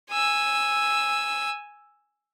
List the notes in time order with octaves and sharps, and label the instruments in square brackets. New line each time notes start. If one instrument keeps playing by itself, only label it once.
[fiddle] G#5 E6